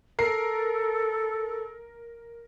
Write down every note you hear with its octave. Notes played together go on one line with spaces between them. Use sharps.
A4 A#4 C7